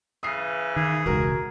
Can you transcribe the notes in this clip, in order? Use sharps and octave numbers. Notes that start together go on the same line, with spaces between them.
C#3 E3 D#6 C7
D#3 G#4
E1 C#2 F#4 A#4